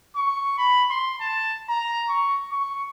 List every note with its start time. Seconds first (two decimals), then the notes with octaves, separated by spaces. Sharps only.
0.16 C#6
0.58 B5
0.90 C6
1.21 A5
1.69 A#5
2.09 C#6
2.51 C#6